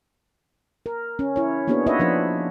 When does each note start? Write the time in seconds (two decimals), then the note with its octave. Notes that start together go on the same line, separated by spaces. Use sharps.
0.86 A#4
1.19 C#4
1.36 E4 C#5
1.68 A#3 B3 D4 F#4 G#4 C#5
1.86 D#4 F4 B4 C#5 D#5 E5
1.99 F3 D4 B4